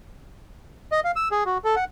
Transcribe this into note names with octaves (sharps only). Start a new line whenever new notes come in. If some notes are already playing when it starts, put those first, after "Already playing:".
D#5
F5
E6
G#4
F#4
A4
F#5